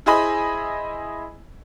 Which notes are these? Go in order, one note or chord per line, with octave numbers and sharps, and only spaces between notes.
E4 G#4 C5 D#5 G#5 B5